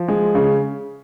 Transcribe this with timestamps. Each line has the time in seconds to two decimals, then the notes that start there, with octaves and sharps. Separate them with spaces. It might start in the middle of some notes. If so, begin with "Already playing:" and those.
Already playing: F3
0.08 G#3
0.35 C#3